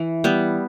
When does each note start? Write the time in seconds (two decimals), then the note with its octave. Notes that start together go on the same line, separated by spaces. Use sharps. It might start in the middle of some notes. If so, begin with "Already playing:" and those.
Already playing: E3
0.24 G3 B3